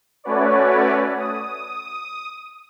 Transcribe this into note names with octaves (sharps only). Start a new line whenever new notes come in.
A3 C#4 F#4 B4 C#5 D5
D#6